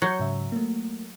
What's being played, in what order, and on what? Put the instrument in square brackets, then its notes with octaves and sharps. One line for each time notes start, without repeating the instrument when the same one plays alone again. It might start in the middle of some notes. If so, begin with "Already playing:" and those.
[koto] F#3 [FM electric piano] G6 C#7
[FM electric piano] G#2 C#3 E5
A3 A#3